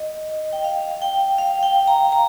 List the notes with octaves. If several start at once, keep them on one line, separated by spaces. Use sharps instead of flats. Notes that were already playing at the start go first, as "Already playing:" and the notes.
Already playing: D#5
G5
F5
G5
F5
G5
A#5
A#5